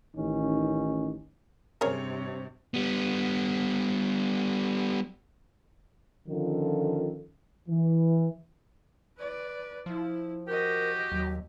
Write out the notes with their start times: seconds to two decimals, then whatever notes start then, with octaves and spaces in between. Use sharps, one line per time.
0.16 A1 D#3 C#4 D#4
1.81 G2 C3 C4 C#4 G#4 A#4 C#5
2.74 G3 B3
6.28 D3 D#3 F3 C#4 F4 A4
7.69 E3
9.18 B4 D5
9.86 F3 E4
10.48 F#4 G4 A#4 D#5
11.12 D#2 F#3